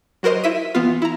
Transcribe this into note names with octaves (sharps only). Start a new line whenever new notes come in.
F#3 F#4 A#4 C5 D#5
E4 E5 B6 D#7
E3 B3 F4
E4 A#5